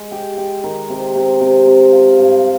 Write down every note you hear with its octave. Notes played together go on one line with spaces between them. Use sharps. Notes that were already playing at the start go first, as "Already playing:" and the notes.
Already playing: G#3
G4
G4
D#3
C3
C3
C3
C3
F4
G2